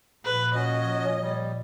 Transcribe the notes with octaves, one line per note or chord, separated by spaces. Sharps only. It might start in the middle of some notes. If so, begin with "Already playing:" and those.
A#2 F3 B4
C#4 F#4 C#5 D#5
G3